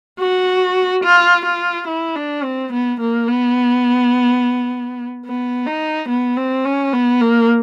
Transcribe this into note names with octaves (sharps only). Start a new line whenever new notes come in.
F#4
F4
F4
E4
D4
C4
B3
A#3
B3
B3
D#4
B3
C4
C#4
B3
A#3